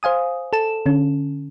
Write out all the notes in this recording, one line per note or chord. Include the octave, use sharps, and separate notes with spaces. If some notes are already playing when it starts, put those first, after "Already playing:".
C5 F5 G#5 D#6
A4 A5 E7
D3 C#4